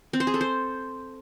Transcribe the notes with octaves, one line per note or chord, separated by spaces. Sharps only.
C4
C5
G#4
A4
C5